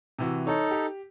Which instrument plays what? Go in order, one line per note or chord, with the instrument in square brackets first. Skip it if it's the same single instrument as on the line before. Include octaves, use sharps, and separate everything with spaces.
[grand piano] C3 E3 F#4
[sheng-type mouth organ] D#4 A4 [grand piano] C#5
[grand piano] G4